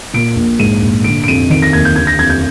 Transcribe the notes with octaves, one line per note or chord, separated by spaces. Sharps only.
A#2 D7
A#1
G#2 D#7
A#1
D3 D7
D7
F2 D#7
D#3 D7
A#6
D#2 G#6
G6
D3 G#6
A#6
F2 G#6
G6